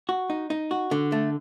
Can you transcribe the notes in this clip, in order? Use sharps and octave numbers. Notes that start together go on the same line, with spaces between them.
F#4
D#4
D#4
F#4
D3
A3